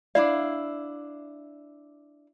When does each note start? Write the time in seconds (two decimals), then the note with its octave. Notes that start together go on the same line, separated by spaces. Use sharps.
0.15 D4 E4 D5 F5